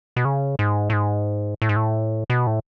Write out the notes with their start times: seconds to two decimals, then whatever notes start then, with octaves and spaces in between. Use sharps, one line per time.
0.16 B2
0.25 C#3
0.59 G#2
0.90 A2
0.93 G#2
1.62 A2
1.69 G#2
1.76 A2
2.30 B2
2.47 A2